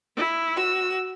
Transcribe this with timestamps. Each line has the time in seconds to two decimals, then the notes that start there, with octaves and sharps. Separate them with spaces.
0.16 E4
0.57 F#4 E6